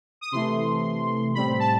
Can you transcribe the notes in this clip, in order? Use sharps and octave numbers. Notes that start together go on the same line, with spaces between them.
D#6
C3 E3 A3 C6
A2 G3 C4 B5
A5